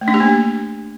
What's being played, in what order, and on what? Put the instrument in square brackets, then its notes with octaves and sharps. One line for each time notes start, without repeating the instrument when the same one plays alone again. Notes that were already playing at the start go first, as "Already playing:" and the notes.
[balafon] A3
D4
G4
A#3